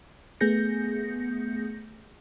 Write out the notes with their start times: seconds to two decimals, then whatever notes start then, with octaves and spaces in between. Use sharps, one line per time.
0.40 A3 B3 G#4 G6 A#6 C#7